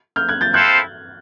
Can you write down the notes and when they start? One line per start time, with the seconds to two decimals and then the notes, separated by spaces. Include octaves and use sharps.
0.16 F6 G6
0.29 F#6 G#6
0.41 G6 A6
0.54 C4 E4 A4 C5 F5 F#6 G#6